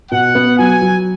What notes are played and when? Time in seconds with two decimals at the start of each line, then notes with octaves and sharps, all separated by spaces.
0.11 B2 F#5
0.35 B3
0.58 F#3 G#5
0.81 F#3